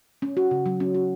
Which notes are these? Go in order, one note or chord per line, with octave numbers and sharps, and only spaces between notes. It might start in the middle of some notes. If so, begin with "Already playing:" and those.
C#4
F#4
C#3
F#3
C#4
F#4